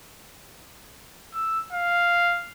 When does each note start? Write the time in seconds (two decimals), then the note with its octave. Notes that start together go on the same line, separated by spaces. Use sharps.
1.35 E6
1.72 F5